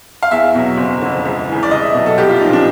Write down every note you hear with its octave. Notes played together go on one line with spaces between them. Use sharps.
F5
E2 E5
B2 F#3
F#1
F2 D3
C#2
C#3 E3
D5
C2 D#5
E5
B2 F#3
A4
C2 G4
F4
A#2 F3 D#4
D4